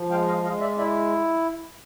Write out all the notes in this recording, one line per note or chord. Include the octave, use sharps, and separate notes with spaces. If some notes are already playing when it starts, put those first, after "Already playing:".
Already playing: F3
G#3 F5 G5
D#5 F5
G#3 D#5 F5
D5 E5
E4 D5 E5